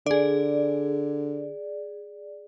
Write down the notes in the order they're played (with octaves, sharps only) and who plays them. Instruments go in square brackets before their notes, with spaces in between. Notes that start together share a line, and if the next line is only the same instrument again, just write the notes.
[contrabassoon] D3 [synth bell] G#4 D5